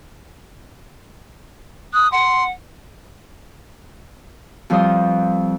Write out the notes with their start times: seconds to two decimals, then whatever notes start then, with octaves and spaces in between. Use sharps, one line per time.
1.93 D#6 F#6
2.12 F#5 C6
4.70 F2 F3 G3 B4 C5 D#6